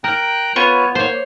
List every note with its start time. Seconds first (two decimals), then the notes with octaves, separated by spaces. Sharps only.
0.04 A#4 G5 A#5 F#6
0.56 B3 F4 B4 C#5
0.95 A#3 C5 C#5